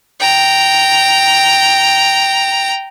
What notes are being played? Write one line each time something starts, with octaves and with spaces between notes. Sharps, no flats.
G5 A#5